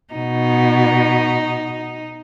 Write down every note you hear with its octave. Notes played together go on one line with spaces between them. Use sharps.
B2 D#4